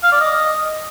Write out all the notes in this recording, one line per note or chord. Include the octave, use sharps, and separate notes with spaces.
F5
D5
D#5